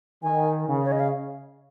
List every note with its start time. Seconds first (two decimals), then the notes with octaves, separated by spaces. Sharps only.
0.23 D#3 G#5
0.69 C#3
0.85 C#5
0.92 D#5
1.00 F5